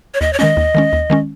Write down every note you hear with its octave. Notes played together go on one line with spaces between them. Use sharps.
C#5
D#2 D#5
C#5
D#3 G#3 C#4 D#5
D#2
D#3 G#3 C#4
D#2
D#3 G#3 C#4